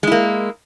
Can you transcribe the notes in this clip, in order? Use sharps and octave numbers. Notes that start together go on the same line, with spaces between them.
G#3 A#3 E4